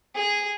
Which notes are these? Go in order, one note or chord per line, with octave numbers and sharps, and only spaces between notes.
G#4